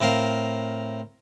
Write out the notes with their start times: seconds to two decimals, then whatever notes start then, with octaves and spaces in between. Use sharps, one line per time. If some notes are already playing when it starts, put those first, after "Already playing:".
0.01 A2 C4 A#4 F5